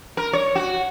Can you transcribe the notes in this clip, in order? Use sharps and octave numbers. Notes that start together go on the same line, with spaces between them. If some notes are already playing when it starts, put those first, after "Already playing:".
A#4
C#5
F#4